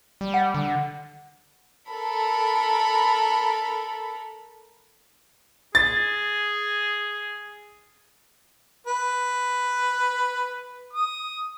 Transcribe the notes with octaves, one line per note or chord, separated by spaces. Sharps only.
G3
F#5
D3
A4 A#4 B5
G#4 A6
B4
D#6